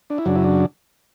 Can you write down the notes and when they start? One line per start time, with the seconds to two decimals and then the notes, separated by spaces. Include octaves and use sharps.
0.10 D4
0.18 E4
0.25 F#2 C#3 F#3 D4
0.35 E4
0.44 D4